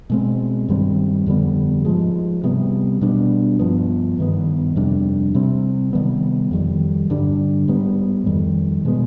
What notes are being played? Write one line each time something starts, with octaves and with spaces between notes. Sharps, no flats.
B2 G#3 C4
G2 D#3 G3 C4
F2 D3 G3 B3
G#2 F3 G#3
C3 G3 B3
B2 G3 B3 D4
G2 F3 B3
G2 D#3 B3
F2 C3 G3 D4
C3 G3 C4
C3 D#3 G3 B3
F2 D#3 G3
G2 D3 G3 D4
G#2 G3 B3
F2 D#3 G3
B2 G#3 B3